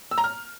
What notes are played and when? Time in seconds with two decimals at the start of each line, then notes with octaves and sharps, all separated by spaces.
0.11 E6
0.18 A#5
0.24 F6